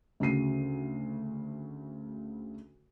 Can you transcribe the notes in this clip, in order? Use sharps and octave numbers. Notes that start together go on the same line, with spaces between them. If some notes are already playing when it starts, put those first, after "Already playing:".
D2 C#3 F#4 C7 D#7